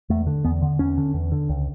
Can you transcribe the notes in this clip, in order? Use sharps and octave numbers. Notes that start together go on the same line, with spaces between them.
E2 A3
D3
E2 B3
D3
E2 C#4
D3
E2
D3
C#2